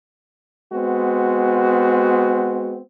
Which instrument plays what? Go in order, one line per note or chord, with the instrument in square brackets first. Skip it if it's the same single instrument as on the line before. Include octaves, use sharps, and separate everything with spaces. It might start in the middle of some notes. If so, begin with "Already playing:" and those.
[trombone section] G#3 B3 C4 F#4